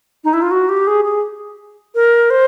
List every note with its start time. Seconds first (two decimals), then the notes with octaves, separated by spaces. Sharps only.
0.24 D#4
0.33 E4
0.42 F4
0.51 F#4
0.69 G4
0.87 G#4
1.05 G#4
1.95 A#4
2.30 C5